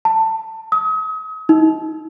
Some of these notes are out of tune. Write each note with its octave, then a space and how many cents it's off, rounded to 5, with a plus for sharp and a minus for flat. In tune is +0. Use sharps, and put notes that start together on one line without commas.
A5 +20
D#6 +40
D#4 +30